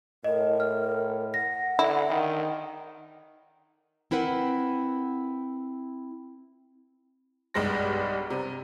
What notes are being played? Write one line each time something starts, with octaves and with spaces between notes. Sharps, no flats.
A2 A#4 D#5
F6
F#5 A#6
D3 E4
D#3
C4 E4 A#4 B4 F#5
B1 G2 G3 G#3 A#6
C3